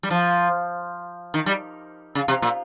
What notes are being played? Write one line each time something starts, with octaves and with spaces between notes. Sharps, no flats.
G3
F3
D#3
G3
C#3
C3
A#2